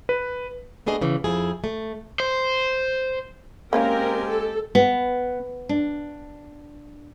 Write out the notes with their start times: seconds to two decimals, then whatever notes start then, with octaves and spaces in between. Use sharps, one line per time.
0.09 B4
0.86 A3 B3 D4 G#4 D#5
1.01 C#3 E3
1.24 F2 F3 E4 G#4
1.64 A3
2.20 C5
3.73 G#3 A#3 C4 C#4 F4 G4 A#4
4.27 A4
4.75 B3
5.69 D4